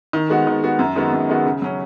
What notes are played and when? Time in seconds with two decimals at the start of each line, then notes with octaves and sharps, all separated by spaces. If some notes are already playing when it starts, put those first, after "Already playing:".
0.13 D#3
0.30 G#3 B3 F#4
0.47 D#3
0.63 G#3 B3 F#4
0.79 F#2
0.96 D#3 G#3 B3 F#4
1.13 F#2
1.29 D#3 G#3 B3 F#4
1.46 C#3
1.62 F#3 C#4